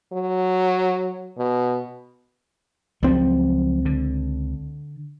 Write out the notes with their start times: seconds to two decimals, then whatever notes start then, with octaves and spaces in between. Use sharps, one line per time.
0.13 F#3
1.38 B2
3.03 C#2 F3 F#3 C4
3.85 D3